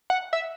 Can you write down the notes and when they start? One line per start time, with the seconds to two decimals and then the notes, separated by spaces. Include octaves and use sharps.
0.10 F#5
0.33 E5